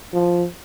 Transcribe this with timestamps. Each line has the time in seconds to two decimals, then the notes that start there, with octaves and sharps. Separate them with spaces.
0.13 F3